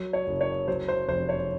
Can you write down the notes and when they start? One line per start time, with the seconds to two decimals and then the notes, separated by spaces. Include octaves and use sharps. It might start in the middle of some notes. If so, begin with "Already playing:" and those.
Already playing: F#3
0.13 C#5
0.27 F#1
0.41 C#5
0.68 F#3 C5
0.88 C5
1.08 F1 C5
1.29 C#5